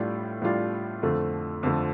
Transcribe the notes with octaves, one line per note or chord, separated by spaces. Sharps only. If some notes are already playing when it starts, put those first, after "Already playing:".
Already playing: A2 G3 D4 F4
A2 G3 D4 F4
F2 D3 F3 A3
F2 D3 F3 A3